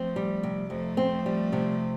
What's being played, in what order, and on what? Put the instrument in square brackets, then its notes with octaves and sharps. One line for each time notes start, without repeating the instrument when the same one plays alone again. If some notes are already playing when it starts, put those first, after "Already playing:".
Already playing: [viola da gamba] F3 A3 [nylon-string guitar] C4
[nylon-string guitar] G3
C3
[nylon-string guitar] F2 [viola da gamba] F3 A3
[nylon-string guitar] C4
G3
C3